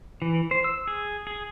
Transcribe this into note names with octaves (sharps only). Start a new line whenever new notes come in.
E3
C5
E6
G#4
G#4